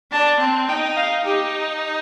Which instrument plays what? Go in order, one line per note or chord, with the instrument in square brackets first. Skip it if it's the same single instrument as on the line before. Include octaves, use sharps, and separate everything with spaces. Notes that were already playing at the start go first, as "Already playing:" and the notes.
[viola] D4 [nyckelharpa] A5
[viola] C4
[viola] D#4 [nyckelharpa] G5
[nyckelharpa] F5
[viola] D#4 [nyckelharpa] G4